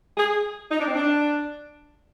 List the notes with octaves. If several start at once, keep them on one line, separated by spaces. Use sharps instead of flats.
G#4
D#4
D4
C4
D4